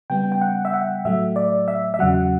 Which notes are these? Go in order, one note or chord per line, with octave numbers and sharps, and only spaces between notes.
C#3 G3 B3 G5
G5
F#5
E5
F#5
A2 F#3 A3 E5
D5
E5
E5
E2 C#3 F#3 F#5